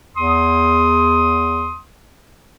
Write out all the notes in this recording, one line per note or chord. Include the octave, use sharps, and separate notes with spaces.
E2 C6 D#6